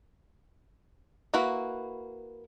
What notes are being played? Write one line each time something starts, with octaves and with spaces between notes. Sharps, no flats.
A#3 E4 F#4 B4